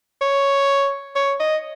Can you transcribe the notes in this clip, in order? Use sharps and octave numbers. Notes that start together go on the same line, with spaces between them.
C#5
C#5
D#5